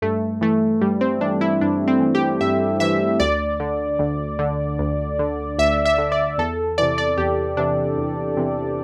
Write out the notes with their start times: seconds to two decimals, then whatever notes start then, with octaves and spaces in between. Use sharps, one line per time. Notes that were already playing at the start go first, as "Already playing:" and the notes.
0.02 G2 A3
0.41 E3 A3
0.81 G2 G3
1.01 C4
1.21 E3 D4
1.41 E4
1.61 G2 D4
1.88 C4
2.00 E3
2.15 G4
2.41 G2 E5
2.80 E3 E5
3.20 D2 D5
3.60 D3
3.99 D2
4.39 D3
4.79 D2
5.19 D3
5.58 D2 E5
5.85 E5
5.98 D3
6.12 D5
6.38 E2 A4
6.78 C3 E3 D5
6.98 D5
7.18 E2 G4
7.57 C3 E3 D4
7.98 E2
8.37 C3 E3